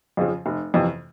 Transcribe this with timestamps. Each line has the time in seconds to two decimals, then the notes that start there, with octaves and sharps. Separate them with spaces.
0.17 F2 C#3 F3
0.46 F1
0.74 F2 C3 E3